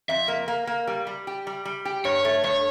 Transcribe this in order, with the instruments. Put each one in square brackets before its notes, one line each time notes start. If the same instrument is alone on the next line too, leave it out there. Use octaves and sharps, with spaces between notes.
[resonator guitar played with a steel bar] F2 [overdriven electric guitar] E5
[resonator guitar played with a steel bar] A#3
A#3
A#3
G3
G3
G4
G3
G3
G4
[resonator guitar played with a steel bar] G2 [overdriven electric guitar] C#5
[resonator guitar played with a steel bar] A3
[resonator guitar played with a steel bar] G2 [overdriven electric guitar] C#5